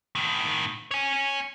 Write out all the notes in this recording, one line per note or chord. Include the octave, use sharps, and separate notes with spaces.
A2 D#3
C#5 G#5